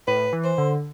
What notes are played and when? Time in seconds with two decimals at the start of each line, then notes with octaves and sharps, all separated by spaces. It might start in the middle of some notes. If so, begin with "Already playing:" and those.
0.07 A2 B4
0.33 E3
0.44 C5
0.58 D3